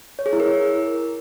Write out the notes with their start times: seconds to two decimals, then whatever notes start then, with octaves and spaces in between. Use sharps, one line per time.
0.19 C#5
0.26 G#4
0.33 E4
0.40 A#4